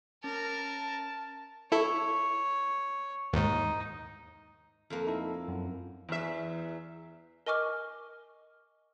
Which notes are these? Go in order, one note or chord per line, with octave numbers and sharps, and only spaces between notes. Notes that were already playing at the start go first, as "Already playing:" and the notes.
C#4 A#4 A5
E4 A4 C#5
D#2 G#2 D#4
F2 A#3
D#4 E4 A4
F#2
E2 E5
A#4 D#5 G#5 C#6 D6 F6